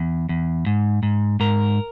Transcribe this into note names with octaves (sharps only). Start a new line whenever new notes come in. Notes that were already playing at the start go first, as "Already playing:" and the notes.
Already playing: E2
E2
G#2
G#2
G#2 A#4